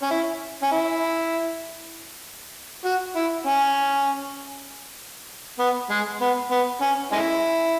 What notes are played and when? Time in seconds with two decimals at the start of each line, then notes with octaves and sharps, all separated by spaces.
0.03 C#4
0.11 E4
0.63 C#4
0.72 E4
2.85 F#4
3.16 E4
3.47 C#4
5.59 B3
5.90 G#3
6.21 B3
6.51 B3
6.82 C#4
7.12 G#3 C#4 E4